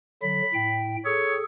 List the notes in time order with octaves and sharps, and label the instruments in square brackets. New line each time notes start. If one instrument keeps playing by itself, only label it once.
[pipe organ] D3 F#3 [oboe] B5
[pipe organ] A2 G5
[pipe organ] G#4 A4 [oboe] C#5